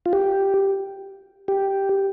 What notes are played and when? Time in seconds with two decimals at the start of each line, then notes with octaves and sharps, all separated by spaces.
0.06 F4
0.13 G4
1.48 G4